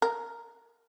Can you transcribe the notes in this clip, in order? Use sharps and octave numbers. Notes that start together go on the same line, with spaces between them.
A#4